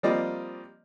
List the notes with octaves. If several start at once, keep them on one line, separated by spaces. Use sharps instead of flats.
F3 G3 A#3 C4 D5 D#5